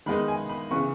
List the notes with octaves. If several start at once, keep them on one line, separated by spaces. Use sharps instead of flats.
D#3 G#3 B3 D#4 B5
G#5
B5
C#3 E3 B3 C#6